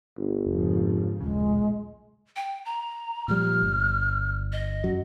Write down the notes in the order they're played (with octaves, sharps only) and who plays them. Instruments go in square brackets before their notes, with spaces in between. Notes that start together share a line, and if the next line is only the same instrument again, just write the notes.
[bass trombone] G1
[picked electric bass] F1 [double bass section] G#2 C#3 F3
[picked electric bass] D#1 C#3 [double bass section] B1 A#2 [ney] G#3
[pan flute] G5
A#5
[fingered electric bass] A#2 F3 G3 [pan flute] F6
[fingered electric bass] G1
[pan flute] D#5
[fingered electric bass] F#2 F#3